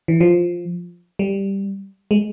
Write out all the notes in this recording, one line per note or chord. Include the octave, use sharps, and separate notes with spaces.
E3
F3
G3
G#3